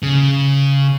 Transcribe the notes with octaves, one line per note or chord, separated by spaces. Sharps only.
C#3